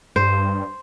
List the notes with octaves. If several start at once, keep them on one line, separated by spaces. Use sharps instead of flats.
G2 C5